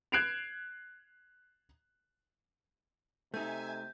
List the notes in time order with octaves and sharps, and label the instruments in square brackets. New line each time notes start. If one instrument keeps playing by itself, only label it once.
[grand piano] F#6 G#6 C7 D7 E7 F7
[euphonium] C3 [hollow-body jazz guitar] A3 D#4 [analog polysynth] E5 G#5 G#6 [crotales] G6